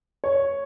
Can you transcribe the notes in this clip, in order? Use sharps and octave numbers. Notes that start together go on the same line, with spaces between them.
C#5